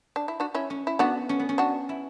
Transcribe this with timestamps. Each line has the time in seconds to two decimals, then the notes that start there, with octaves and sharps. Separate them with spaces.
0.16 D4
0.28 E4
0.40 D4 F#4
0.55 C#4 E4
0.70 C#4
0.87 E4
0.99 B3 D4 F#4
1.29 C#4
1.39 B3
1.49 C#4
1.58 D4 F#4
1.89 E4